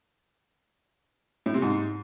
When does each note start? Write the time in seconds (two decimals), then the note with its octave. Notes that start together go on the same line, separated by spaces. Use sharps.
1.46 A2
1.54 C3
1.62 G#2